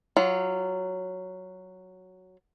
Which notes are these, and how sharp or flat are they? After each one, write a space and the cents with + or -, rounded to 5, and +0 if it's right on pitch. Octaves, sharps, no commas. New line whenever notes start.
F#3 +0 F4 -15